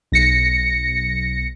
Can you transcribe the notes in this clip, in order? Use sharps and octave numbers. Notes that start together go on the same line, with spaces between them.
B1 A#6 C#7